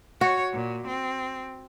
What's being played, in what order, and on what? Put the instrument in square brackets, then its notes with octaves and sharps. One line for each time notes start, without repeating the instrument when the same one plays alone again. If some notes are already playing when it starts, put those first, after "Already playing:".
[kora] F#4 [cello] C#5
[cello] A#2
C4